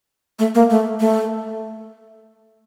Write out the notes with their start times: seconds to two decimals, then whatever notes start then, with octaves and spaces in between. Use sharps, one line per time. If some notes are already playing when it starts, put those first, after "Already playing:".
0.39 A3
0.55 A#3
0.70 A3
1.00 A3